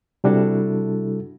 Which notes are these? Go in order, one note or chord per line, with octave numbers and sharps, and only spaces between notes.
C3 G3 D4 E4 F#4 A4